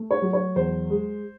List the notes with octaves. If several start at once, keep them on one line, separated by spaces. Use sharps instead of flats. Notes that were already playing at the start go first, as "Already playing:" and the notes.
Already playing: A3
C#5
F#3
C#5
E2 C5
G#3